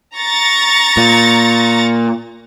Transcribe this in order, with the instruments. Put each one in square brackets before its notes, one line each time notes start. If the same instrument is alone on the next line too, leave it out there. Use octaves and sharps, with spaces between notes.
[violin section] A#5 C#6 A6
[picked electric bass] A#2